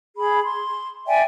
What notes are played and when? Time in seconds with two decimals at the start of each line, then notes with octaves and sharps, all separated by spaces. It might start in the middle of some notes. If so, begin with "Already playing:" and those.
0.16 G#4 B5
0.44 C6
1.07 D5 E5 G5 G#5